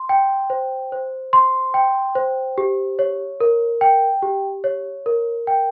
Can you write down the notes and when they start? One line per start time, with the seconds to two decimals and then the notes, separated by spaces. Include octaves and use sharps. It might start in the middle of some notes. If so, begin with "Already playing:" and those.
Already playing: C6
0.09 G5
0.50 C5
0.92 C5
1.33 C6
1.74 G5
2.15 C5
2.58 G4
2.99 C#5
3.40 A#4
3.81 G5
4.22 G4
4.64 C#5
5.06 A#4
5.47 G5